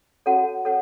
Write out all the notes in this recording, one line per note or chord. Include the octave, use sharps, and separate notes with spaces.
F#4 A4 C#5 F#5 A5
A4 C#5 F#5